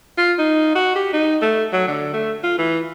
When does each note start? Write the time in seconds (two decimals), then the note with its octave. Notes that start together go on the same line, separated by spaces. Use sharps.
0.18 F4
0.39 D#4
0.75 F#4
0.96 G4
1.13 D#4
1.42 A3
1.73 F#3
1.88 D3
2.14 A3
2.44 F4
2.58 E3